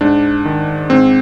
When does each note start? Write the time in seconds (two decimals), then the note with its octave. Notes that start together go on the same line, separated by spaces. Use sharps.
0.01 G#2 D4
0.45 D#3
0.90 G#2 C4